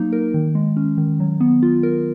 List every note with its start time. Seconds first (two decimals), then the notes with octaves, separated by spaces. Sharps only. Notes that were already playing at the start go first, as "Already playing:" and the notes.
Already playing: F#3 A#3 D#4
0.12 A#4
0.34 D#3
0.55 G#3
0.77 C#4
0.98 D#3
1.20 F#3
1.40 B3
1.63 F4
1.83 A#4